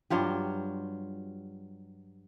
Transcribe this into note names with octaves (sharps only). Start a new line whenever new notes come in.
G2 F#3 F4 G4